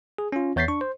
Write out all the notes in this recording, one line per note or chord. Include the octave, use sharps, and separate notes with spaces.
G#4
C#4 F4
E2 C#5 G6 A6 B6 C7
D4 C#6
C5